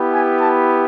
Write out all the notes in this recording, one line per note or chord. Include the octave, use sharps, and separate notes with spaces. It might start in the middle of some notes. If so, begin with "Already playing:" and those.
Already playing: B3 E4 G4
G#5
A5